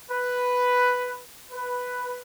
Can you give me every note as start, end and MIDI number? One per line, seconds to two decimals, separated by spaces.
0.10 1.21 71
1.51 2.21 71